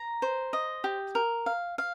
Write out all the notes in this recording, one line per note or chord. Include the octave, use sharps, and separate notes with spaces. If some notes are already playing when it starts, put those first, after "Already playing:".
Already playing: A#5
C5
D#5
G4
A#4
F5
F5